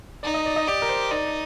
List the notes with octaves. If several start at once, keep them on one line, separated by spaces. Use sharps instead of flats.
D#4 D5
D#5
D5
D#5
G4 D5
A#4
C5
D#4 D5